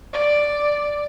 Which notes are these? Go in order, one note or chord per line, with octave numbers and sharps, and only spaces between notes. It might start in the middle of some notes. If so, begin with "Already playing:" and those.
D5